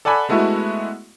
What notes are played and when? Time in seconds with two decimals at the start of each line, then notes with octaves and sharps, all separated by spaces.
0.05 A4 D5 F#5 G#5 B5
0.29 G#3 A3 B3 E4 F#4